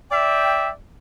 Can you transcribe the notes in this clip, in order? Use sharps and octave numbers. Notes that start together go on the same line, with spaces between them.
D5 E5 G5